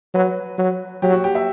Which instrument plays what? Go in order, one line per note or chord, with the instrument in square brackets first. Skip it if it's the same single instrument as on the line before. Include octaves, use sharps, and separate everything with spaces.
[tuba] F#3 [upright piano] B4
[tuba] F#3
[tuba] F#3 [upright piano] G4
[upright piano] F#4
G4
E5